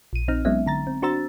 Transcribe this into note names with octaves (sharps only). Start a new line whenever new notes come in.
A#1 D#7
A#1 C4 D#4 F6
F#3 G#3 B3 C#4 D#4 E5
D3 A#5 A6
C4
D4 F#4 C5 A#5 E6 A6